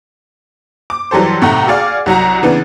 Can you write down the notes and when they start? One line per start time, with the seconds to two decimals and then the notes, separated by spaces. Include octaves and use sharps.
0.90 D6
1.11 E3 F#3 G3 A4 C5
1.42 A2 C3 A3 D#4 F#5 A#5
1.67 F#4 G#4 D5 F5
2.06 C2 F#3 F#4 A#5
2.42 C#3 E3 B3 D4